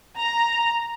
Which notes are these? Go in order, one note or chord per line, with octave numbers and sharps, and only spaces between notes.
A#5